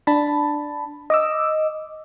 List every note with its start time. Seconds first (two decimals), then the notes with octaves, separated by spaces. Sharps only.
0.07 D4 A5 B5
1.10 D#5 D6 E6